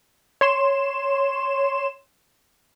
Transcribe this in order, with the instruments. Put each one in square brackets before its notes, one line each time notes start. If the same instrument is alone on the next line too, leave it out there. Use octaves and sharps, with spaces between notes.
[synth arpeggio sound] C#5 C6 E7